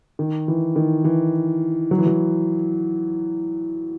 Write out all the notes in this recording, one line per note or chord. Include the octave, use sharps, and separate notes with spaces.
D#3
E3
D#3
E3
F#3
E3
F#3